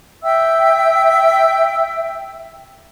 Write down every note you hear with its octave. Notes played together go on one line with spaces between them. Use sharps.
E5 G5 E6